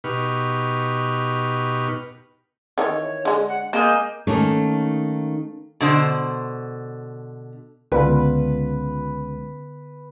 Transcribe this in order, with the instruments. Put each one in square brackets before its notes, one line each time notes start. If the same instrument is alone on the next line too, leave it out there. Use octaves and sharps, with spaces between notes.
[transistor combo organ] B2 D#4 G4 B4 C#6 F6
[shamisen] D#3 E3 [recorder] C#5
[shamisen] D3 G#3
[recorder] F#5
[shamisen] G#3 [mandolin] A#3 D#5 G6 [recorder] G#5
[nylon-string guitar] D#3 A3 A#3 C#4 D#4
[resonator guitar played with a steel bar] B2 D3 C5
[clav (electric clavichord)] C#2 F4 [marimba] D3 B3 [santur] B4